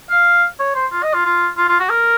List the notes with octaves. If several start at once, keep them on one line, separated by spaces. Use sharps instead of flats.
F5
C#5
C5
F4
D#5
F4
F4
F4
F4
F#4
A#4